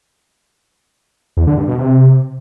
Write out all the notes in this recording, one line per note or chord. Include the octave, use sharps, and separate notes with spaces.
E2
D3
G2
B2
C3